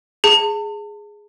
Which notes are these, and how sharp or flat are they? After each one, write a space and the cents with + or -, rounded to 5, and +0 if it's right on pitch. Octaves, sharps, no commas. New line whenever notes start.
G#4 +0 A5 +35